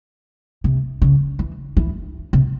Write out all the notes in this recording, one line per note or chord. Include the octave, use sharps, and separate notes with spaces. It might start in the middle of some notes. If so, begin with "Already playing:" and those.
C3
C#3
E3
E3
C3